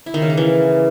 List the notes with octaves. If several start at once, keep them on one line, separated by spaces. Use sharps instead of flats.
E4
D#3
C#3
A#3
E3